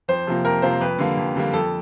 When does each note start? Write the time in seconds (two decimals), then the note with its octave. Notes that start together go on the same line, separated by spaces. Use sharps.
0.08 F2 C5
0.27 C3 F3 A#3
0.45 F2 A#4
0.62 C3 F3 A#3 C5
0.81 F2 B4
0.98 D3 G3 A#3
1.17 F2
1.35 D3 G3 A#3
1.53 F2 A4